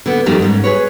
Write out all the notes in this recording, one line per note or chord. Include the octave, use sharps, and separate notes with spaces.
D3 B3
F2 D#3 G3 A3 D#4
G#2 C#4
G#4 B4 C#5